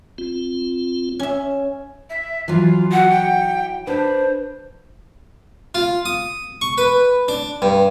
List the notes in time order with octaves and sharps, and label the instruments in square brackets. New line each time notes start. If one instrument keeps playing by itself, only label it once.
[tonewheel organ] C4 F4
[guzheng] C#4 E5
[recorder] E5
[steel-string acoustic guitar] E3 F#3 [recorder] F4
[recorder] F#4 [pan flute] F#5
[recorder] G5
[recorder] D4 [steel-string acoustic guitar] B4 [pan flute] C5
[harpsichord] F4
D#6
C#6
B4
D4
G2